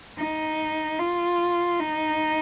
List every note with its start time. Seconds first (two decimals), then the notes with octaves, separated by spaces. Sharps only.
0.19 D#4
0.99 F4
1.80 D#4